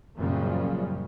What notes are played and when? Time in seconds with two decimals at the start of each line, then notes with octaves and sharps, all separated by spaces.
0.17 F#2 A#2 C#3 F3 G3